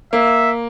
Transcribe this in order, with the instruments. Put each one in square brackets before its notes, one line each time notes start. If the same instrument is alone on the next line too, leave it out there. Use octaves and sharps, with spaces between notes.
[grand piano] A#3 [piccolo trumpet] E5